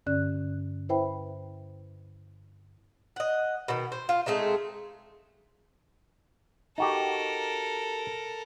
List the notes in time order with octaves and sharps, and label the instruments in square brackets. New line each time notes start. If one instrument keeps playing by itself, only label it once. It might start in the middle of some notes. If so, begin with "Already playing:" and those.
[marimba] G2 D3 C#4 D5 F#6
E4 B4 C5 E5 G5 B5
[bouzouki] D#5 F#5
B2 D#3
C5
F4
G#3 A3 C4 D#4
[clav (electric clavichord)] D#4 F#4 G4 [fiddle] A4 A#4